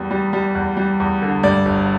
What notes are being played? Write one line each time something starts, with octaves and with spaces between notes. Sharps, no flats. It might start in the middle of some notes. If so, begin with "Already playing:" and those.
Already playing: E2 G3
G3
G3
E2
G3
E2
D3
G2 D5
G1